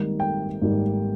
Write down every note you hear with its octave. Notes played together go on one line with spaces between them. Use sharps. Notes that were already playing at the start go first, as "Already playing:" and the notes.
Already playing: G#1 G#2 D#3 G3 A#3
G5
G#1 G#2 D#3 G3 A#3